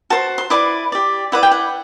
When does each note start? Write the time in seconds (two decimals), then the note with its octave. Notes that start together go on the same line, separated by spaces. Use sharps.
0.10 F#4 C5 A5
0.38 C6
0.50 E4 B4 D5 D6
0.92 G4 D5
1.32 E4 B4 D5 F#5
1.43 G5
1.52 F#5